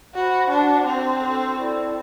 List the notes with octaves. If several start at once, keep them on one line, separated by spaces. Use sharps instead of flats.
F#4 C5 F#5 B5
D4 F#4 C5 F#5 A5
C4 D4 A4 C5
D4 F#4 A4
E4 A4 D5